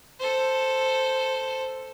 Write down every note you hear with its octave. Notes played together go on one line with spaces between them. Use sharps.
A4 C5